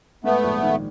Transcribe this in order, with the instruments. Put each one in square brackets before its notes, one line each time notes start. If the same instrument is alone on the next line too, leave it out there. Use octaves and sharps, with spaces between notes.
[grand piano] G#2 [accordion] A3 B3
[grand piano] A#1
D#3